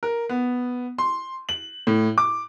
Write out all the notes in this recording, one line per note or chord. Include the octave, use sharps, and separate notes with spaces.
A#4
B3
C6
F#7
A2
D6